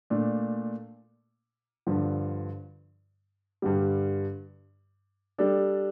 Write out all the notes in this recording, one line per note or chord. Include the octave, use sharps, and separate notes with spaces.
A#2 A3 D4
G2 D3 F3
G2 D3 G3
G3 D4 A4 D5